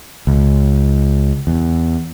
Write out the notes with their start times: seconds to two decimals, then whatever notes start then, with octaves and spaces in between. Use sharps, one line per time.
0.27 C#2
1.47 E2